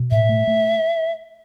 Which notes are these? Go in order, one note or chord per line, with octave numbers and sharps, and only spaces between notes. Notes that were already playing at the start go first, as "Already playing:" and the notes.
Already playing: B2
A2 E5
A3
A3